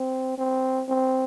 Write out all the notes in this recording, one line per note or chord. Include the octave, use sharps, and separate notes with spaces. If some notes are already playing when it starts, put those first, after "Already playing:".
Already playing: C4
C4
C4